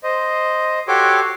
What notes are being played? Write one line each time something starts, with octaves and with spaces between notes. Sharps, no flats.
C5 D#5
F#4 G4 A4 C#5 C6 D6